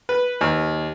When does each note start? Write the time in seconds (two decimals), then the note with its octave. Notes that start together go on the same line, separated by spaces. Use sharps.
0.09 B4
0.41 D#2